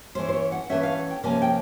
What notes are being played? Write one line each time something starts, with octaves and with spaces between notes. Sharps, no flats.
E3 A3 C#4 C5
C5
C#5
F#5
E3 A3 C#4 E5
F5
F#5
G5
C3 F3 A#3 C#4 G#5
G5